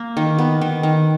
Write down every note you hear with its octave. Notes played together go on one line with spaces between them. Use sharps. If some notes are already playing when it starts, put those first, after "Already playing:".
Already playing: A#3
D#3
B3
D#3
D#3